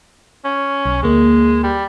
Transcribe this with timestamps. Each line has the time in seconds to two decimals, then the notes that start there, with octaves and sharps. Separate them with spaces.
0.44 C#4
0.86 B1
1.03 D2 G#3 A#3
1.63 G3